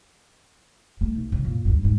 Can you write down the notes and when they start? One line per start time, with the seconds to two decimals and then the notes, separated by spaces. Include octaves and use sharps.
1.01 A3
1.15 B1
1.32 C#3
1.44 F#2 A#2
1.65 D2 G2
1.83 D#2 G#2